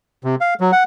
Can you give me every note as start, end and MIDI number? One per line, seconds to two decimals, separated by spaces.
0.24 0.35 48
0.41 0.54 77
0.60 0.71 54
0.72 0.83 78